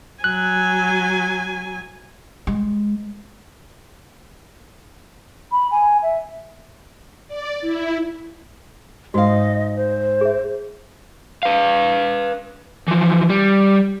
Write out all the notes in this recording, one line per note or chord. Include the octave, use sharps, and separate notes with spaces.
F#3 G#5 F#6
G#3
B5
G#5
E5
D5
E4
G#2 F#4 D#5 F5
C5
G#4 E5
B4 F5
E3 F3
G3